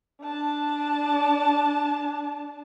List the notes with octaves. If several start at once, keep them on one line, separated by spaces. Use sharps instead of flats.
D4 A5